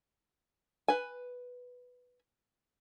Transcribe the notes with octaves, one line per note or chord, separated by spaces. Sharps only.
B4 G#5